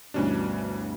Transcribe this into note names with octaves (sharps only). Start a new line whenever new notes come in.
D2 G2 B2 E3 C#4 D4